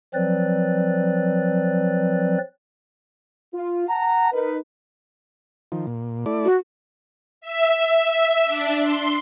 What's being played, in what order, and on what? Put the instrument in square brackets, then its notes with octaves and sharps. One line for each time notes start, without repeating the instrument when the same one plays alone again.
[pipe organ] F3 F#3 C4 B4 D5
[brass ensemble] F4
F#5 A5 A#5
D#4 A#4 B4
[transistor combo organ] D#3 F3
A#2
A3 E4 D5
[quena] F#4
[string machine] E5
D4
C6